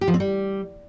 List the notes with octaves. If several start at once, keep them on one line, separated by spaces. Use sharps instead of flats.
G4
F3
C4
G3